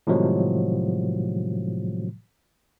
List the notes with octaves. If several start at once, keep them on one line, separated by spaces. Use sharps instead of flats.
A2 C3 D#3 F3 F#3 G#3